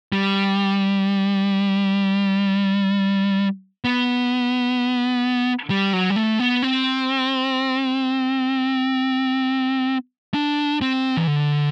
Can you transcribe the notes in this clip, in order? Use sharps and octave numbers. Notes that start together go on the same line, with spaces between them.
G3
B3
G3
F#3
G3
A3
B3
C4
D4
C4
E3
D3